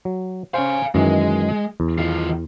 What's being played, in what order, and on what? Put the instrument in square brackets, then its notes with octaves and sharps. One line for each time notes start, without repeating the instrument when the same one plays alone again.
[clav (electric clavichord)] F#3
[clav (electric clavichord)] C#4 C5 [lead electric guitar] F5 G#5
[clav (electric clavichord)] F#2 D#3 E3 [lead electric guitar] G#3
[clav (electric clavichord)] E2
[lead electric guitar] D#3 F4